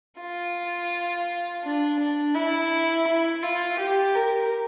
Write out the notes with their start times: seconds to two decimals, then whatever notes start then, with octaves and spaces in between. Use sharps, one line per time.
0.19 F4
1.63 D4
1.99 D4
2.35 E4
3.07 E4
3.43 F4
3.79 G4
4.15 A#4